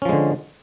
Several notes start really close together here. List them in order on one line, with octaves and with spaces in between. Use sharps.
C#4 F3 G#3 D3